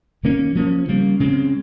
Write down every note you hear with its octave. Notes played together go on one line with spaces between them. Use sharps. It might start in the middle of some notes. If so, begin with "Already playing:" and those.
C3 D#3 A#3 C#4
F3 A#3 C#4
C#3 G3 A#3
C#3 G#3 C4